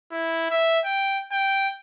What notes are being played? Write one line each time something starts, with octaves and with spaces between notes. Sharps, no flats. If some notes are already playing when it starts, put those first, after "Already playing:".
E4
E5
G5
G5